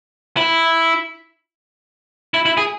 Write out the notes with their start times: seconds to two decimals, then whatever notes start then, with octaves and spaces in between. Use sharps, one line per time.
0.37 E4
2.34 E4
2.46 E4
2.57 G#4